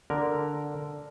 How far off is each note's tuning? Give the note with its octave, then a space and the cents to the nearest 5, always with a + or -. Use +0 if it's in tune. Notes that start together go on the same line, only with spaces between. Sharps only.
D3 +0 A#4 +0